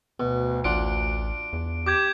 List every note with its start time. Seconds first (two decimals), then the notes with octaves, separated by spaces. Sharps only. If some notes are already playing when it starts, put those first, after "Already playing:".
0.20 D2 B2
0.64 A1 D4 F4 F#5 D7
1.53 E2
1.86 G4 D6 G6 G#6